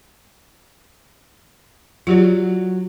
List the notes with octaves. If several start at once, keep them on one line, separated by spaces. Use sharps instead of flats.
F#3 F4 G4 D5